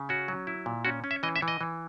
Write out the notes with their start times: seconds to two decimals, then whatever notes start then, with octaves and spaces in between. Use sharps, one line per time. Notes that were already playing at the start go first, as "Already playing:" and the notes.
Already playing: C#3
0.09 C#4 F#4
0.28 F#3
0.47 E4
0.66 A#2
0.85 C#4 F#4
1.04 C#4
1.11 E5
1.23 E3 D#5
1.36 E5
1.42 E3
1.48 D#5
1.61 E3